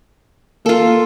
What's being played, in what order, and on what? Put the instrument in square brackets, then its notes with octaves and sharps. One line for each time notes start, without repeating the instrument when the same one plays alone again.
[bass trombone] A#3 [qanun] F4 A4